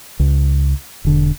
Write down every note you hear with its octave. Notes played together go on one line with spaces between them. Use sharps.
C#2
E1 D3